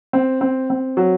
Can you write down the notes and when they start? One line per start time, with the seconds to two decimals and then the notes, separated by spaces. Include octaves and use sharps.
0.13 C4
0.41 C4
0.70 C4
0.97 F#3